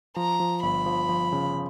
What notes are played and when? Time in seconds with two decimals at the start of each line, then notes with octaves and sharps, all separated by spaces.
0.16 F3 A#5
0.40 F3
0.63 G1 B5
0.86 F3
1.09 F3
1.32 C#3